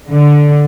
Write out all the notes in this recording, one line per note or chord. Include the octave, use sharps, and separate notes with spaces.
D3